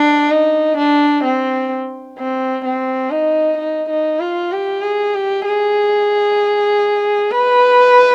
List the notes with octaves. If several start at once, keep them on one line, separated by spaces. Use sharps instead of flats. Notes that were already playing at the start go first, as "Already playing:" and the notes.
Already playing: D4
D#4
D4
C4
C4
C4
D#4
D#4
D#4
F4
G4
G#4
G4
G#4
B4